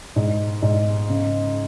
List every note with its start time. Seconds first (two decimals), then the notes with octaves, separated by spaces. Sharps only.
0.16 G#2
0.62 G#2
1.09 C#3